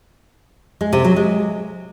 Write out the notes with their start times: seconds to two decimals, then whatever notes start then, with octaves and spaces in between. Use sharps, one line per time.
0.81 G#3
0.93 C3
1.04 F#3
1.16 G#3